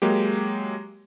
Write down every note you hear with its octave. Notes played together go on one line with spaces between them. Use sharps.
F#3 G#3 A#3 G4